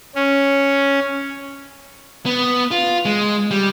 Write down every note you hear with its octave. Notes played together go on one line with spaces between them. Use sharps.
C#4
B3
F4
G#3
G3